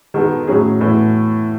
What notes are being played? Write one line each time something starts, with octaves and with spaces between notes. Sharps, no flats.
D#3 G#3 B3 F#4 A4
A2 F#3 C#4 G#4
A2 E3 B3 F#4 A4